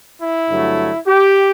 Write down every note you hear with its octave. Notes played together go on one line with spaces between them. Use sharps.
E4
G2 D3 F#3 A3
G4